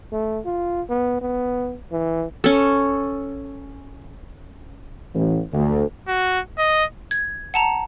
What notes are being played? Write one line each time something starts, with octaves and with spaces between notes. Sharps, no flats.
A3
F4
B3
B3
E3
C#4 A4
A1
D2
F#4
D#5
G#6
F#5 A5 A#5